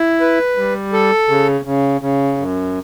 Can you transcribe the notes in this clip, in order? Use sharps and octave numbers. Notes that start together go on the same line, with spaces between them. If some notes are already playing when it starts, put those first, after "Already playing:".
Already playing: E4
B4
G3
A4
C#3
C#3
C#3
F#2